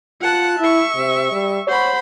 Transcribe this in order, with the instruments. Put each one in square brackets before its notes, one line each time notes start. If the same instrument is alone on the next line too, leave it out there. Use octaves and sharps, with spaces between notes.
[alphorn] F4 [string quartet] F#5 A5 F#6
[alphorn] E4 [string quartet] E5 C#6
[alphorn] C3
G3
[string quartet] C5 F#5 B5 [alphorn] C#5